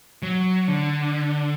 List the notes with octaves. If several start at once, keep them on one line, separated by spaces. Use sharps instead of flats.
F#3
D3